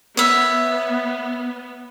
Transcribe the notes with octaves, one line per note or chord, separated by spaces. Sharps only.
B3 C#5 E5